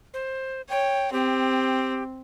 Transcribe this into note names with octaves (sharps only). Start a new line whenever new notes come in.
C5
C#5 G5
C4 G4